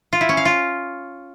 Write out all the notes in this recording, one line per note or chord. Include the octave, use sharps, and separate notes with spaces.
F4
E4
C#4
F5
F4